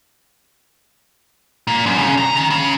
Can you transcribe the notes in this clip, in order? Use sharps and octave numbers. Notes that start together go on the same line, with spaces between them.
A#2
F#2
C#3
A#5
D#3
C#3